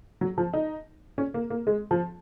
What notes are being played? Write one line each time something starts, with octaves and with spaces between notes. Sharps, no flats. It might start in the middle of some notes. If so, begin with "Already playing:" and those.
F#3
F3
D#4
C#4
A#3
A#3
G#3
F3